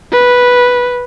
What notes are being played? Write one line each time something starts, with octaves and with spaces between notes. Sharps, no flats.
B4